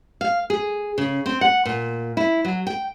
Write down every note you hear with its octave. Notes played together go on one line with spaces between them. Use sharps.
F5
G#4
C#3
C4
F#5
A#2
E4
F#3
G5